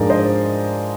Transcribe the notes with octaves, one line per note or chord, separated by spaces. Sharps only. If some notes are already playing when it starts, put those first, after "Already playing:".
Already playing: G#2 F3 G#3 D4 A#4 D5
C5 D#5